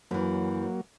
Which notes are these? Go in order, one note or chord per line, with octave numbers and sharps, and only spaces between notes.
F#2 E3 F#3 A#3